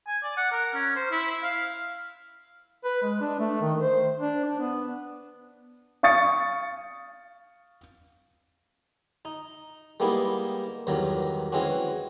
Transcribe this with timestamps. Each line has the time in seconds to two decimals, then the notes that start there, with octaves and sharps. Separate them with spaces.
0.07 G#5
0.23 D5
0.37 F#5
0.52 A#4
0.74 C#4
0.96 C5
1.11 E4
1.43 F5
2.84 B4
3.02 G#3
3.21 D4
3.39 A3
3.61 D#3
3.80 C5
4.19 D4
4.44 D4
4.59 B3
6.03 F5 C#6 D#6 A6 C#7
9.25 D#4
10.00 G3 G#3 A#3 B3 D#4 E4
10.87 E2 G2 D#3 F#3
11.52 E3 G#3 C4 C#4 F#4